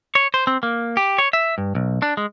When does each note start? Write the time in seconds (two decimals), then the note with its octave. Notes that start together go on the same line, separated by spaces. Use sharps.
0.15 C#5
0.34 C5
0.47 C4
0.63 A#3
0.97 G4
1.18 C#5
1.33 E5
1.58 G2
1.75 B1
2.02 D4
2.17 G#3